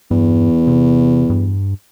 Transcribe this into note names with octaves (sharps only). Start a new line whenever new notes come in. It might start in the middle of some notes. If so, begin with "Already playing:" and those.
E2 G2
C3
G2